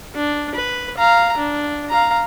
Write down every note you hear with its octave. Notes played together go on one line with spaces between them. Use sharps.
D4
B4
F5 A#5
D4
F5 A#5